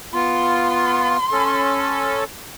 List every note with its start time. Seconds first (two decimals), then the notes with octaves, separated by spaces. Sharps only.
0.14 B3 F4 C6
1.32 C#4 A4